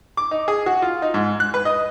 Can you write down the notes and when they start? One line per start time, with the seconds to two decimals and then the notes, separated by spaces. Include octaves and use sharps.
0.17 D6
0.31 D#4
0.48 G#4
0.66 F#4
0.82 F4
1.02 D#4
1.14 G#2
1.40 F#6
1.54 B4
1.65 D#5